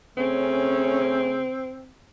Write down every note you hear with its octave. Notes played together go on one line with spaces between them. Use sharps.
C#3 A3 C4 C#4